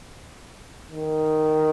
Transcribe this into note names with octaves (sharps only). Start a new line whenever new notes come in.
D#3